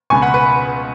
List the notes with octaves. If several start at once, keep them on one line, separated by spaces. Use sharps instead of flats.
C#2 B2 B3 G#5 C#6
F#5 B5
B4